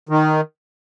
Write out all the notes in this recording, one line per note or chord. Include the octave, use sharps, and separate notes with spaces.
D#3